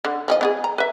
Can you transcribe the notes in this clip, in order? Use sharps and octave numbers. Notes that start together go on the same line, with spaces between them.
D3
F3 G#4 D#5
B3 F4 G#4
A#5
B4 E5